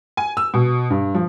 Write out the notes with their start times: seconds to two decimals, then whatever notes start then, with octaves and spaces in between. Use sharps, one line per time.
0.17 G#5
0.37 E6
0.54 B2
0.90 G2
1.15 F3